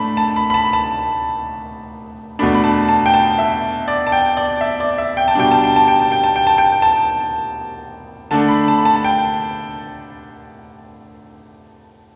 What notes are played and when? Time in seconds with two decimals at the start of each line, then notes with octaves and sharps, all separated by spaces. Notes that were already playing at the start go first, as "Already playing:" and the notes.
Already playing: A2 A3 D4 A5 B5
0.17 A5
0.36 B5
0.50 B5
0.54 A5
0.73 A5
2.39 E2 B2 A3 D4 B5
2.55 B5
2.64 A5
2.89 A5
3.06 G5
3.14 A5
3.39 E5
3.88 D5
4.07 A5
4.12 G5
4.37 D5
4.61 E5
4.80 D5
4.98 E5
5.17 G5
5.28 A5
5.35 B2 G3 D4 G5
5.51 A5
5.64 G5
5.76 A5
5.88 G5
6.00 A5
6.12 G5
6.24 A5
6.36 G5
6.47 A5
6.58 G5
6.82 A5
8.31 D3 A3 D4 A5
8.48 B5
8.68 A5
8.78 B5
8.85 A5
8.96 A5
9.04 G5